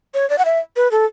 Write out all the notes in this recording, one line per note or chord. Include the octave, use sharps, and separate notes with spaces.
C#5
D5
F#5
E5
B4
A4